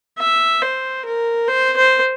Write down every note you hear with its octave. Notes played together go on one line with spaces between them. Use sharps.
E5
C5
A#4
C5
C5